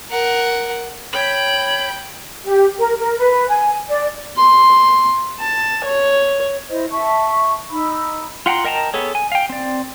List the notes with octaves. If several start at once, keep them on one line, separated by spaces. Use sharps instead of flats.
A#4 F#5
C#5 G5 B5
G4
A#4
A#4
B4
G#5
D5
C6
A5
C#5
E4 C5 D#5
E5 A5 C#6
D#4 B5 E6
F4 F#5 G5 A#5 C6
A#4 D#5 G5 A5 A#5
B3 G#4 A4 C#5
G#5
F5 G5
C4 D5